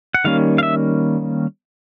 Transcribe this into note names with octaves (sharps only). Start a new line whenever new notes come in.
F#5
D#3 G3 A#3 C#4 F5
F5
E5